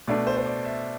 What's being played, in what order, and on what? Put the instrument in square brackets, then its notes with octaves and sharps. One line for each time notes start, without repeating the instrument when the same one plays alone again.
[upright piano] B2 A3 D4 [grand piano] D5
[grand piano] C5
C5
D5
E5